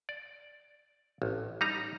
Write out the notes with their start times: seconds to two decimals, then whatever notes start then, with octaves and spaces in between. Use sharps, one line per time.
0.09 D5
1.22 A1
1.61 G3 D#4 A#5